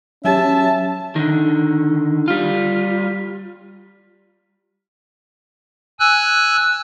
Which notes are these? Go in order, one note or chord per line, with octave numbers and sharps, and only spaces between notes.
F#3 C#4 G4 E5 A5
D3 D#3
G3 F4
G#5 E6 F#6